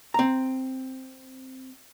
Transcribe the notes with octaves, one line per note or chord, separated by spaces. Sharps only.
C4 A#5